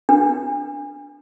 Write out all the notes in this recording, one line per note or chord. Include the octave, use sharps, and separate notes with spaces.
D4